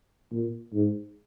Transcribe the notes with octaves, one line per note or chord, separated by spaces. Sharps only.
A#2
G#2